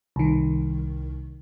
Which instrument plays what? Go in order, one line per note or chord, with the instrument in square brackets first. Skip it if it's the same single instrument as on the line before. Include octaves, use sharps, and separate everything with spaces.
[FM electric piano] C2 D#3